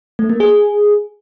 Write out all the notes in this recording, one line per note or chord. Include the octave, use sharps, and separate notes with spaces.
A3
A#3
G#4